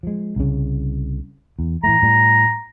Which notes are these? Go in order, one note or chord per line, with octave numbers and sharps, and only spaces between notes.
F3 G#3
C2 C#3
E2
A2 E3 A3 A#5
A2 G3